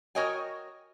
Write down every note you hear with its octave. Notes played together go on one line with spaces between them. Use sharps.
F#4 A#4 C#5 D#5 G5 G#5